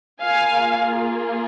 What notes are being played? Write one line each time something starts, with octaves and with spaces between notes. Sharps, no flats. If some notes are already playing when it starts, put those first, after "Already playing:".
A#3 F4 G#4 F5 G#5